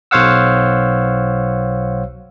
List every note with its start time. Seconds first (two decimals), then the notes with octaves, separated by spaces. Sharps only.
0.11 B1 C5 C#5 F5 F#5 E6